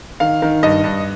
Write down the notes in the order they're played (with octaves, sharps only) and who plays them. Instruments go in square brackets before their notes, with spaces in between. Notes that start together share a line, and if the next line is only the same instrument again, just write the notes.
[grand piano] D#3 F5
D#3
G2 D#5
G2